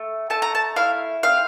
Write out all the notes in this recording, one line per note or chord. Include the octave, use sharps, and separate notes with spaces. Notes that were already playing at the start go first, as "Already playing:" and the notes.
Already playing: A3
A3 A5
A#5
A5
E4 F5
C4 F5